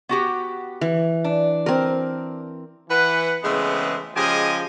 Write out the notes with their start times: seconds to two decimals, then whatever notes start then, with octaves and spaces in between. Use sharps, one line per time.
0.09 B3 F#4 G4
0.81 E3
1.24 D4
1.66 C4 A#4
2.90 E3 B4 F#5
3.43 C#3 E3 G#3 A3 B3 C4
4.16 C#3 F3 G#3 G4 D#5 G#5